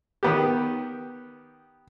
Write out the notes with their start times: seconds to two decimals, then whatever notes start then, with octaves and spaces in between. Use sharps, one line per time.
0.23 D#3 B3 G4